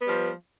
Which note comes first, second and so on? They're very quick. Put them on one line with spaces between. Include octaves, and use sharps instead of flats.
B3 G3 F3